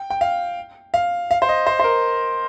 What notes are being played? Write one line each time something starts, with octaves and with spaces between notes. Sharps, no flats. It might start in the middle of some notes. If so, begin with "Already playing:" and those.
Already playing: G5
G5
F5
F5
F5
C5
D#5
C5
C5
A#4